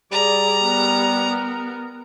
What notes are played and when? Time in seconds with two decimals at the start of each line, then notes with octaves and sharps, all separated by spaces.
0.12 G3 G#4 D5 A#5
0.64 B3 A#4